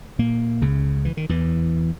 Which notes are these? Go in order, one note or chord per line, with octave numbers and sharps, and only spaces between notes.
A#2 A#3
C#2 C#3
E3
D#3
E2 E3